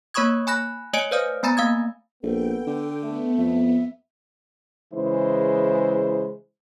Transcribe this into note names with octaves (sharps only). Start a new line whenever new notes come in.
A#3 C#5 B5 C#6 D#6 G#6
G#5 B5 F#6 A#6
A3 C#5 D#5 G#5 C#7 D7
B4 C5 D5 F5 D#6 F6
A3 B3 G#5 A#5 B5 A6
A#3 F5 D#6 G#6
A#1 B3 A4 G5
D3
A3 B3
F2 E5
C#3 E3 G#3 E4 C5